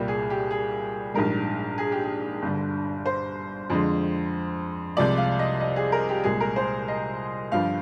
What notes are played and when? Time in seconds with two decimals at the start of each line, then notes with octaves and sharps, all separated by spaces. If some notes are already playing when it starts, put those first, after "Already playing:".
Already playing: C2 A#2 G3 G4
0.08 G#4
0.30 G4
0.51 G#4
1.14 A#1 G#2 G3 A#4
1.78 G#4
1.92 G4
2.04 G#4
2.42 G1 G2 D3
3.06 C5
3.70 F2 D3 G#3
4.97 C2 C3 F3 G#3 D5
5.18 F5
5.39 D#5
5.60 D#5
5.76 G#4
5.92 A#4
6.09 G4
6.24 C2 A#2 G#3 G#4
6.40 A#4
6.56 C5
6.88 D#5
7.51 G1 G2 F3 F5